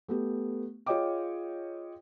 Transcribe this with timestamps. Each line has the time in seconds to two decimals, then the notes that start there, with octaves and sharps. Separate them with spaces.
0.08 A3 B3 G4
0.86 F4 G#4 C#5 D#5 G5 D6